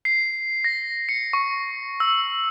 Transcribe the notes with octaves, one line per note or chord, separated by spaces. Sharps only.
C7
A#6
C#7
C#6
E6